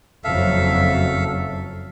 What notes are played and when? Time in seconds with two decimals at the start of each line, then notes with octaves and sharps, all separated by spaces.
0.24 F#1 F2 F#3 A4 E5 F5